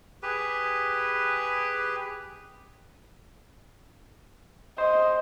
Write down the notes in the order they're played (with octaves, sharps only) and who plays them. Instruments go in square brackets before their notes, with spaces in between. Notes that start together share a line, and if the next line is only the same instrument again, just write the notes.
[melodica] G4 G#4 B4
[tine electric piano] C5 [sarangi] D#5